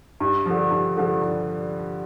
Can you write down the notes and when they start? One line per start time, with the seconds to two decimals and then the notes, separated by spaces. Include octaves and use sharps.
0.20 G2
0.46 D3 F3
0.71 G2
0.97 D3 F3
1.22 G2